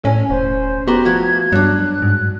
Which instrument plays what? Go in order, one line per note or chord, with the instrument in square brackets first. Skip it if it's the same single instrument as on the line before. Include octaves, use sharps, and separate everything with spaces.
[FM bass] A2 [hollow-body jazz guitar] C#4 [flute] G#5
[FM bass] E1 [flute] C5
[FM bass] B3 [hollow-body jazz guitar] F#4 G4 C6 [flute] A#5
[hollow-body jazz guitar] F3 A3 F#4 [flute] G#6
[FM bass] G2 [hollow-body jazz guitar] F#3 D4 [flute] F#6
[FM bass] G#2